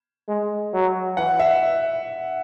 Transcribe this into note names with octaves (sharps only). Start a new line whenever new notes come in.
G#3
F#3
E3 F#5
E5